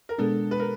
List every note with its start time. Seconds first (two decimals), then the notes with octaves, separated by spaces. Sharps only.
0.09 A#4
0.18 B2 G#3 B3 D4 A4
0.51 B4
0.60 A#4